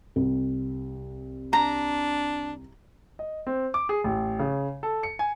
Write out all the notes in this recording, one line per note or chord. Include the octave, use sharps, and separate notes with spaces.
C2
D4 A#5
D#5
C4
D6
G#4
A1
C#3
A4
C#7
G#5